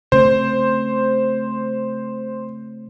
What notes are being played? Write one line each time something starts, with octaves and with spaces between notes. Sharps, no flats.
C#3 A3 C4 C5